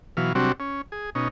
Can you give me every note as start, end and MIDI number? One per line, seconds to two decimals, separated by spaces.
0.17 0.33 47
0.17 0.33 52
0.17 0.33 54
0.17 0.33 77
0.35 0.52 48
0.35 0.52 54
0.35 0.52 55
0.35 0.52 60
0.35 0.52 62
0.35 0.52 66
0.60 0.82 61
0.92 1.10 68
1.15 1.28 47
1.15 1.28 61
1.15 1.28 63